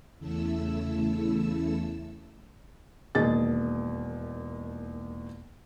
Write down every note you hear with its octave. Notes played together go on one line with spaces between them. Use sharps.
E2 C#3 A3 E4 A4 E6
E1 D#2 G#4 D#5 A6